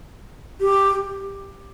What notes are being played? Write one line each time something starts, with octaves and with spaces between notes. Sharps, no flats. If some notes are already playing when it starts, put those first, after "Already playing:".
G4